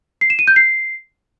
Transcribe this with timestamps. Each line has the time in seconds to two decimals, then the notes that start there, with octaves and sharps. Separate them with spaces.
0.21 C7
0.30 E7
0.39 D#7
0.48 G6
0.56 C7